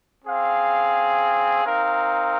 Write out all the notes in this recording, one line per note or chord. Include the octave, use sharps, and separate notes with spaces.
C4 G#4 F5
C4 D#4 A#4 F5